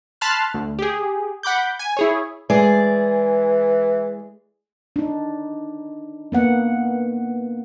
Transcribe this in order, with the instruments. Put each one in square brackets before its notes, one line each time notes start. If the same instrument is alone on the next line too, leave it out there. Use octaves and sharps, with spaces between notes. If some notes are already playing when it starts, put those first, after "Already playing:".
[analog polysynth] A5 B5 C6 F6 F#6
D2
G4 G#4
F#5 B5 D6 G6
G#5
E4 G#4 C#5
[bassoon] E3 [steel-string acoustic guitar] G#3 G#4 D5
[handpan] D4 D#4
A#3 B3 F#5